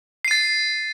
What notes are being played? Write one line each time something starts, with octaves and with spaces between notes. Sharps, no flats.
A6 C7 D#7